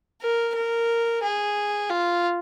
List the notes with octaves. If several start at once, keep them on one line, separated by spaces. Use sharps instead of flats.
A#4
A#4
G#4
F4